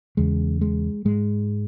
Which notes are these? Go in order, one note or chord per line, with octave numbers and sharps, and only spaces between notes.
E2 C#3 G#3
G#3
G#2 G#3